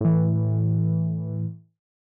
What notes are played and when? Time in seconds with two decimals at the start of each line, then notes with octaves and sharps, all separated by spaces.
0.01 A2 E3